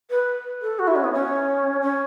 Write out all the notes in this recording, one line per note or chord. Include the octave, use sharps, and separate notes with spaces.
B4
A4
F#4
E4
C#4
B3
C#4
C#4